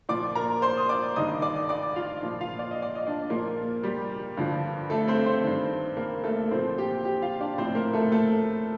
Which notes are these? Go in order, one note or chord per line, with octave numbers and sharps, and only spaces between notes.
A#2 F3 D5 D6
A#4 A#5
C5 C6
D#6
D5 D6
G2 D#3 D#5 D#6
D5 D6
D5 D6
F4 F5
A#2 F3
F4 F5
D5
D#5
D5
D#5
D4 D5
A#2 F3 A#3 A#4
G3 G4
G2 D3 F3
A3 A4
C4 C5
C4 C5
G2 D#3
A#3 A#4
A3 A4
A#2 F3 C4 C5
G4 G5
G4 G5
F4 F5
D4 D5
A2 F3 C4 C5
A#3 A#4
A3 A4
A3 A4